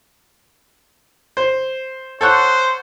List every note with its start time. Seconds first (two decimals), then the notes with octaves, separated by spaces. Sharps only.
1.37 C5
2.21 A4 C5 C#5 F#5